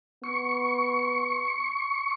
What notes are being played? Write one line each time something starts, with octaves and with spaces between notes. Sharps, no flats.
B3 C#6